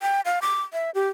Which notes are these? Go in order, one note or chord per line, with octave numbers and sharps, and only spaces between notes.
G5
F5
D6
E5
G4